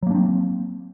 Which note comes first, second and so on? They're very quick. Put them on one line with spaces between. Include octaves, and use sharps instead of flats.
F#3 A#3 D4 C4